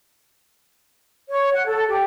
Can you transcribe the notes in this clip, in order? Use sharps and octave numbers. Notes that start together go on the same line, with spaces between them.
C#5
F#5
A4
G4